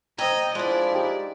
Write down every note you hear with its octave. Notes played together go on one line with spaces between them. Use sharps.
C5 D#5 G5 A#5 E6 G#6
F3 G#3 D4 E4 D5
D#4 G4